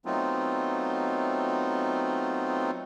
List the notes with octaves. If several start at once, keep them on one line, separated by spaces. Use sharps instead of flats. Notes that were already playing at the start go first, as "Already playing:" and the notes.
F#3 A3 B3 C4 D#4 F4